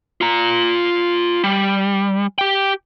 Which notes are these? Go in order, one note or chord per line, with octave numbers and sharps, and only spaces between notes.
F4 A#5
G3
G4 G5